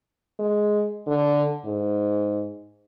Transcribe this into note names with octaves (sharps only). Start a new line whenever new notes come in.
G#3
D3
G#2